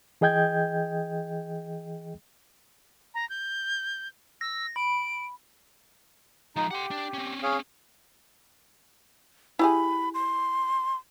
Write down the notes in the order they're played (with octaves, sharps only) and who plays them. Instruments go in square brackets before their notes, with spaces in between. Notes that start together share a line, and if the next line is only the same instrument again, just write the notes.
[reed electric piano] E3 G#4 D#5 G5 G6 G#6
[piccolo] A#5
G6
[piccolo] E6 [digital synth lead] A#6
[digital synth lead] B5 [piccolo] D7
[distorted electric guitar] F3 G#3 [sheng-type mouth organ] D#4
[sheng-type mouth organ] G4 [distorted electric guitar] F#5 C6
[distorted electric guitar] D4
C4 C#4
[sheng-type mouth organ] G#4 C#5 F5
[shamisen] E4 G4 G#4 [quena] B5
[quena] C6